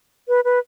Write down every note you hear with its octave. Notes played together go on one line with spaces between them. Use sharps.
B4
B4